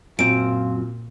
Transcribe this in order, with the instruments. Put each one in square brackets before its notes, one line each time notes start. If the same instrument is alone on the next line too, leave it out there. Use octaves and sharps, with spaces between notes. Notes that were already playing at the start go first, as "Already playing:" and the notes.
[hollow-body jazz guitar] F#2 C4 [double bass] A#2 [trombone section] F4 [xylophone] D7